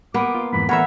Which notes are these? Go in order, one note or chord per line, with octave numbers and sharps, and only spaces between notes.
A#3 B3 D6
F4
F2 G#2 E3 B5
E3 A3 B3 A#4 C#5 E5 F#5 B5